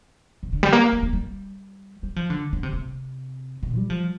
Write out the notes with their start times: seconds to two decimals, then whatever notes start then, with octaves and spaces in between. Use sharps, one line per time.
0.43 C3
0.53 D3
0.63 G3
0.73 A#3
0.93 C4
1.03 A#3
1.13 G3
2.03 G3
2.16 F3
2.30 D3
2.53 D3
2.63 C3
2.73 C3
3.63 A#2
3.76 G3
3.90 F3